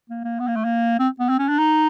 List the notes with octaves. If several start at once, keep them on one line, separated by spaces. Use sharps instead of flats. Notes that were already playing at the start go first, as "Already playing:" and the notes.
A#3
A#3
B3
A#3
A3
A#3
C4
B3
C4
C#4
D4
D#4